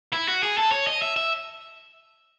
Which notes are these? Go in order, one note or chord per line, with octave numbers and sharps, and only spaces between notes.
E4
F#4
G#4
A4
C#5
D#5
E5
E5